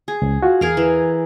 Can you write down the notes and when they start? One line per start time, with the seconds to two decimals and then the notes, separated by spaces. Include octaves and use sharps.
0.08 G#4
0.22 C#2
0.43 F4 F#4
0.61 E2 G#4 A#4 F5
0.77 E3